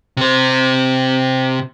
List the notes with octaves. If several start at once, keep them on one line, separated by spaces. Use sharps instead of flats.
C3 C5